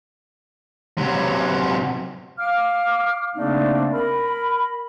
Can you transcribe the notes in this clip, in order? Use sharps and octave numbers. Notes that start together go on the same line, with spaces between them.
C3 F#3
F5 D6 F6
C#3 A3 A#3 C4 D4 D#4
A#4 B5